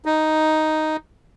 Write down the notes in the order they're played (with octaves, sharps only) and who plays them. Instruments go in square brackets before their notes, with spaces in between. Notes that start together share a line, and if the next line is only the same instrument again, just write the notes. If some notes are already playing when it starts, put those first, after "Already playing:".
[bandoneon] D#4